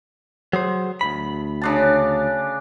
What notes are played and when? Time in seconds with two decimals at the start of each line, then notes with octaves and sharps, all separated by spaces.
0.53 F#3 G#4 C5
1.01 D2 G2 B5
1.61 C#3 D4 A5